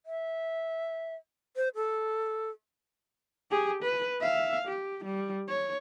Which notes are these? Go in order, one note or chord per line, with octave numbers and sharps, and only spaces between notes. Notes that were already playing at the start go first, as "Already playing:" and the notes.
E5
C5
A4
G4 G#4
B4
E5 F5
G4
G3
C#5